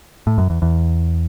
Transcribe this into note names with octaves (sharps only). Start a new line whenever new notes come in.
A2
F#2
E2
E2